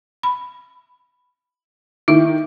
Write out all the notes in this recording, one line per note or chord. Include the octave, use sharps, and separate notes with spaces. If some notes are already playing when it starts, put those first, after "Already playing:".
B5
D#3 E4 E5